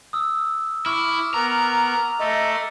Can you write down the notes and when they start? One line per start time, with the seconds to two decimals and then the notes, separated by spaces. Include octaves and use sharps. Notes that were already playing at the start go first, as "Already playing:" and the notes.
0.13 D#6 E6
0.86 E4 C#6 D6 F6
1.34 B3 A#4 A#5
2.19 A3 D#5